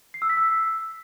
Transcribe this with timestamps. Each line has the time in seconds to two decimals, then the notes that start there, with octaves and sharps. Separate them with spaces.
0.14 C7
0.22 E6
0.30 B6
0.37 E6